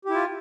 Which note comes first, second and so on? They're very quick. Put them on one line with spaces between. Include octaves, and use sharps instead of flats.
G4 E4 F4